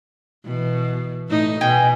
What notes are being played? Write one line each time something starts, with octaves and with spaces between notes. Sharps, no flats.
B2 E3
A2 D#4
B2 D#5 G5 G#5